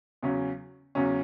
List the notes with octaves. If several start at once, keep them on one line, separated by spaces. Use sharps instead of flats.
E2 C#3 F#3 C#4
E2 C#3 F#3 C#4